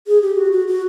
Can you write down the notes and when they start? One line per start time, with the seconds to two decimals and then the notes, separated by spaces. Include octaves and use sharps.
0.07 G#4
0.22 G4
0.37 F#4
0.52 F#4
0.68 F#4